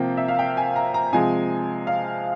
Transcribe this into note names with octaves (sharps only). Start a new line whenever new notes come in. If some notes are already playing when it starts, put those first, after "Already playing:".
Already playing: C3 F3 A#3 G5
E5
F5
G5
G#5
A#5
A#5
C3 F3 G#3 G#5
F5